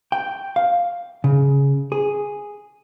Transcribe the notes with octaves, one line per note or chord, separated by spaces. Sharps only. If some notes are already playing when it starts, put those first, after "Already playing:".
G5
F5
C#3
G#4